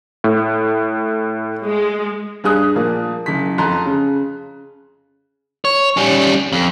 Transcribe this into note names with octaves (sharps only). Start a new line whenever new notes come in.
A2
G#3
G2 G#4 D#6 F#6
A#2 F3 A#3
F#1 B6
F2 A#5 C6 F#6
C#3
C#5
G3 C#4
F2